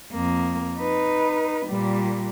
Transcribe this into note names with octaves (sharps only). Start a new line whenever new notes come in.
F2 A#3
D#4 B4
A#2 G3